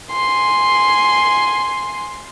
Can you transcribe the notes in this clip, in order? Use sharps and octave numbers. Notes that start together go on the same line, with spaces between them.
G#5 C6